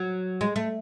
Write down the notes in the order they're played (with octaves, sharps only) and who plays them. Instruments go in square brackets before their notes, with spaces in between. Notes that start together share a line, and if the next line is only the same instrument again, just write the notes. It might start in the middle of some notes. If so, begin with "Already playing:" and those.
Already playing: [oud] F#3
G#3
A3